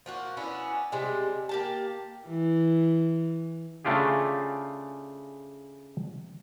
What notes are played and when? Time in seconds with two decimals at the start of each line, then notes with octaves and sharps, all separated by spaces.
0.06 F3 A#3 F#4
0.37 B3 C#4 D4 E4
0.92 C3 G3 G#3 D4
1.49 A#3 G4 A5
2.27 E3
3.85 C#3 A3 D4 F4 G4 G#4